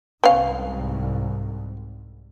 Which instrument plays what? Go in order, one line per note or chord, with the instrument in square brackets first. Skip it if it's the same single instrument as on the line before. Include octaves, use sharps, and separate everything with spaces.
[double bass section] C2 G#2 [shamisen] B3 C#4 F5